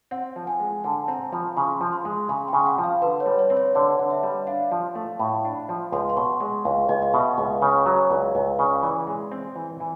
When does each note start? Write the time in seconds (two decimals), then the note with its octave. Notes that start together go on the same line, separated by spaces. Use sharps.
0.11 C4 F#5
0.36 F3
0.47 G#5
0.60 G#3
0.84 D3 A5
1.08 C4 A#5
1.32 F3 B5
1.57 C#3 C6
1.81 F3
1.93 C6
2.05 G#3
2.29 C#3 C6
2.48 C#3 G5
2.66 F#5
2.78 F3
2.84 F5
3.02 D3 B4
3.20 C#5
3.26 G3
3.39 C#5
3.50 C4
3.57 C#5
3.75 D3 D5
3.99 D3
4.10 E5
4.23 G3
4.47 D4 F5
4.71 F3
4.95 A3
5.19 A2 B5
5.45 D4
5.69 F3
5.92 C#2 C6
6.09 C6
6.17 B2 C#6
6.40 G#3
6.65 C#2 F5
6.89 C#2 D#5
7.02 D#5
7.13 B2 E5
7.38 C#2 D#5
7.62 C#3 C#5
7.86 F#3 C#5
8.10 C#2 D5
8.35 C#2 D#5
8.59 C#3 D5
8.83 E3 D5
9.07 G#3
9.32 C4
9.56 E3
9.80 E3